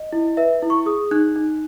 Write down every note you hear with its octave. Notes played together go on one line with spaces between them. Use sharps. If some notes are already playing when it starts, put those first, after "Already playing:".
Already playing: D#5
E4
B4 E5
E4
C#6
G#4 D#6
D#4 F#6
D#4